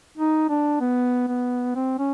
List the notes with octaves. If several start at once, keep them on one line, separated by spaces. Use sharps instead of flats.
D#4
D4
B3
B3
C4
C#4